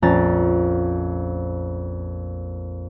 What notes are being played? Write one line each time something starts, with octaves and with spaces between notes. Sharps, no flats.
A#1 F2 A3 C#4 A#5 A6